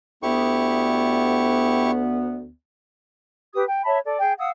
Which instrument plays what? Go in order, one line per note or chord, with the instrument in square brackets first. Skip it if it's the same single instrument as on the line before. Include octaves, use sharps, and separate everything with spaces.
[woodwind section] D2 B3 [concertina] E4 G4 C#6
[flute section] G4 B4 D#6
G5
C#5 E5 A5 B5
A4 D5
G#4 G5
F5 F#5 D#6 E6